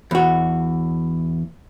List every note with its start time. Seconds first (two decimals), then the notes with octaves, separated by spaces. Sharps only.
0.11 E2 F#4